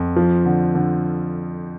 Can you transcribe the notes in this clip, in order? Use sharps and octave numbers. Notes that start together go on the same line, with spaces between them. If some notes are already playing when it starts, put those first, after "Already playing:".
Already playing: F2
F3
D3
D3